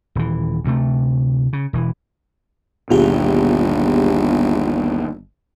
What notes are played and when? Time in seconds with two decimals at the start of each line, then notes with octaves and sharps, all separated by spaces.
0.15 D#1 E3
0.64 D2 C3 A3
1.53 C#3
1.73 E1 E3
2.90 G1 D#2 B2 F4 G4 G#4